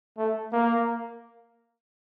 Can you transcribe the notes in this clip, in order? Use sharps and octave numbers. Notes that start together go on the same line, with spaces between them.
A3
A#3